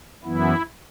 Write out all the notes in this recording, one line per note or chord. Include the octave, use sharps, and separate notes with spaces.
F#2 E3 B3 E4